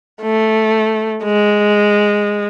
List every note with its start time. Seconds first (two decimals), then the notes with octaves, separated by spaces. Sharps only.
0.22 A3
1.24 G#3